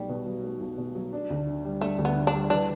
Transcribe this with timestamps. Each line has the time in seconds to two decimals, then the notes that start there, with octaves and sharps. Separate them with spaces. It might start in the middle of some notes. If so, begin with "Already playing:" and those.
Already playing: B1 G3 A3
0.09 B2
0.27 F#3
0.44 A3
0.60 B1
0.78 B2
0.95 F#3
1.13 D4
1.30 D2
1.47 D3
1.64 G3
1.81 A3 D4
1.98 D2
2.05 B3
2.16 D3
2.27 D4
2.33 G3
2.50 E3 D4